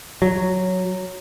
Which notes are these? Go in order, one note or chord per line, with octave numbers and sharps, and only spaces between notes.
F#3